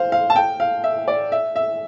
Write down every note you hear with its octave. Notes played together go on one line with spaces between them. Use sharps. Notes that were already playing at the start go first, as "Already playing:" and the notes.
Already playing: C5 F5
F5
A5
G5
F5
E5
D5
E5
E5